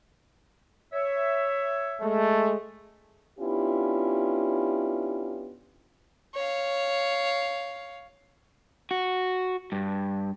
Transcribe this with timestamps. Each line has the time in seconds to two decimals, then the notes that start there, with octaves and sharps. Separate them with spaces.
0.93 C#5 E5
2.02 G#3 A3
3.39 B3 C#4 D4 E4 F4 G4
6.35 C#5 F5
8.91 F#4
9.72 G2